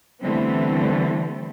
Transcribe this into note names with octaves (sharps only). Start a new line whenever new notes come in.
D3 E3 G3 A3 B3 C4